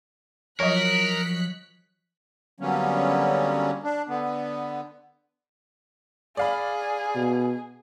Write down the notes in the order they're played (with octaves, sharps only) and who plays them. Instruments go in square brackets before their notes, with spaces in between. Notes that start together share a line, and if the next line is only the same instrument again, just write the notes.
[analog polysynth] F3 F#3 [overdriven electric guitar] A#4 [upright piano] C#5 D#5 [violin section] F#6 B6 C#7
[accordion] D3 F#3 G3 A#3 B3 C#4
D4
D3 B3
[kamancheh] G#4 [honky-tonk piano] D5 F5 B5
[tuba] B2